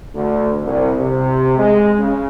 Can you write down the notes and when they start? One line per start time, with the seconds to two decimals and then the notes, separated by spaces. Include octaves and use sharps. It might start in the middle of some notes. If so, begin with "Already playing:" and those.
0.14 D2
0.63 C2
0.98 C3
1.58 G#3
1.97 C#3